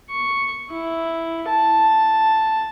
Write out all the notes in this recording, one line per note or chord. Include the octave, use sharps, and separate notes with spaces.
C#6
E4
A5